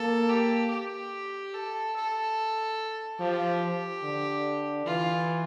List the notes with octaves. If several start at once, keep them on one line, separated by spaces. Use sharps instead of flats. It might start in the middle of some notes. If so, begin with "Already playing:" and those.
Already playing: A#3 A4
G4
G4
A4
A4
F3 G4
D3
E3 F4